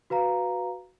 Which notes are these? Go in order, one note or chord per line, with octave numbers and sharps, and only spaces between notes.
F#4 B4 F5 A#5